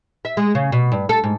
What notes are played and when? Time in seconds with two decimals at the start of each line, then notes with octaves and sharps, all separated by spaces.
0.25 E5
0.37 G#3
0.55 C#3
0.72 B2
0.92 G2
1.09 A4
1.24 G#2